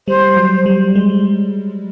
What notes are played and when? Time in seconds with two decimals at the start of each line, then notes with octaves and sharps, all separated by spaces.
0.08 G3 C5
0.37 F#3
0.66 G3
0.95 G#3